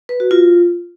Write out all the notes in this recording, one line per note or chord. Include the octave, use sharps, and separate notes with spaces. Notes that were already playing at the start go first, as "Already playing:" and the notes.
B4
F#4
F4